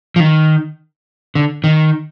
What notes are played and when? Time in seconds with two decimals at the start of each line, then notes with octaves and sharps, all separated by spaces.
0.16 F3
0.20 D#3
1.35 D3
1.64 D#3